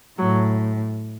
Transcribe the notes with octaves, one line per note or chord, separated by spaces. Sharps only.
A2 F#3